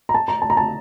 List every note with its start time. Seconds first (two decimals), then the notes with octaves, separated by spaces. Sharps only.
0.09 A#5
0.14 A5
0.28 A#5
0.42 A5
0.50 A#5
0.57 A5